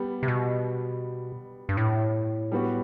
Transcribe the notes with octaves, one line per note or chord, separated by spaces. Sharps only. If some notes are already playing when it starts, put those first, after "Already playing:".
Already playing: G3 B3
C3
B2
G2
A2
G3 B3 F#4